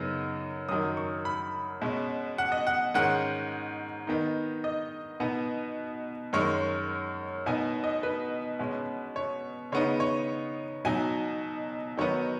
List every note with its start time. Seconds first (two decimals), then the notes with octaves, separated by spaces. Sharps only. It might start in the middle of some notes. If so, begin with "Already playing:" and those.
Already playing: F#2 C#3 B3 D#4
0.69 F#2 D#3 F#3 D#6
0.97 C#6
1.25 B5
1.82 B2 G#3 C#4
2.38 F#5
2.52 D#5
2.67 F#5
2.94 G#2 D#3 G#3 C#4 F#5
4.07 D#3 B3 D#4
4.64 D#5
5.20 B2 B3 D#4
6.33 F#2 D#3 G#3 C#5
7.46 B2 B3 D#4 G#5
7.84 D#5
8.03 B4
8.59 B2 G#3 C#4
9.16 C#5
9.72 C#3 B3 D#4 C#5
10.00 C#5
10.85 B2 F#3 D#4 G#5
11.97 D#3 F#3 B3 D#4 C#5